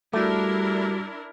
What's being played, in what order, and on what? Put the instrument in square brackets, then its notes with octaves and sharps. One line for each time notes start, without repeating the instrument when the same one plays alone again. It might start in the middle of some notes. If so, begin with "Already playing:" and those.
[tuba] G3 [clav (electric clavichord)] A3 [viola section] D4 E4 A#4 [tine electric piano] F#4 D6